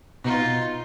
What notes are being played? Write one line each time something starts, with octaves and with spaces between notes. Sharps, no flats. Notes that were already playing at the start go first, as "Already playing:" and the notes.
B2 D#4 F4